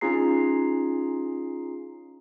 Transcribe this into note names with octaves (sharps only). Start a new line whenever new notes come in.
C#4 D#4 F4 G#4 A#5 C7